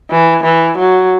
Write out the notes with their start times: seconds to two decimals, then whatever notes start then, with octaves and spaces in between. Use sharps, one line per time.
0.10 E3
0.44 E3
0.78 F#3